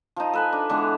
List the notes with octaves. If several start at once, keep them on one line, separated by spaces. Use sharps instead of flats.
F3 D#4
A4 B4 G#5
D4
D3 E3 G#3 B3